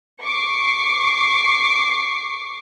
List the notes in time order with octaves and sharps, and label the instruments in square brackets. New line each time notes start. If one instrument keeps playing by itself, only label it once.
[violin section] C#6 D6 C7